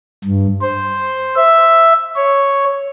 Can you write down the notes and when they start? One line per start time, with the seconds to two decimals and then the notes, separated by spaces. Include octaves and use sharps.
0.24 G2
0.62 C5
1.36 E5
2.16 C#5